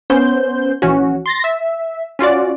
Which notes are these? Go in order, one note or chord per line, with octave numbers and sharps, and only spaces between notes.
B3 C#4 C5 G6
A#1 E3 C#4 F#4
C6 A6 A#6
E5
C#4 F4 F#4 D5